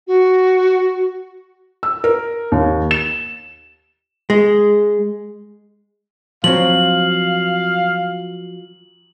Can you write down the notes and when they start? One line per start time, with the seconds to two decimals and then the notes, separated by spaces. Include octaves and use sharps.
0.07 F#4
1.83 E6
2.04 A#4
2.52 D#2
2.91 E7
4.30 G#3
6.44 F3 F#3 C4 F5 F#7